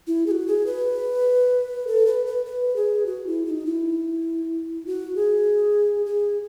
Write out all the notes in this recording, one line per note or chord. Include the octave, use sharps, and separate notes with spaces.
E4
G#4
F#4
G#4
B4
A4
B4
B4
B4
G#4
F#4
E4
E4
D#4
E4
F#4
G#4
G#4